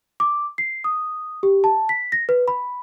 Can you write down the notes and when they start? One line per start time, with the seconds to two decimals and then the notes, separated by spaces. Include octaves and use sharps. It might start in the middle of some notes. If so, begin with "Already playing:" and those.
0.20 D6
0.58 C7
0.84 D#6
1.43 G4
1.64 A5
1.89 B6
2.12 A#6
2.29 B4
2.48 B5